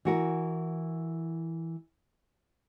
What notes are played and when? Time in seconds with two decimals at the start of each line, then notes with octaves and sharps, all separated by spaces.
0.05 E3 F#4 A#4